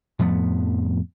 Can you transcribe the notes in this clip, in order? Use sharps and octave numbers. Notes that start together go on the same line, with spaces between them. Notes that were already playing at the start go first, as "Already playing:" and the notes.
F2 A2 F3 B3